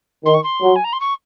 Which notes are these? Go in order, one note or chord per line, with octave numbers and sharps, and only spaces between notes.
D#3 C6
C#6
C6
F#3
G#5
A#5
C6
C#6